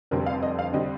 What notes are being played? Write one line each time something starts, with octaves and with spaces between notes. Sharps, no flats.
F1 F2 D3 G3 C4 A#4
F5
D#5
F5
D3 G3 C4 D#5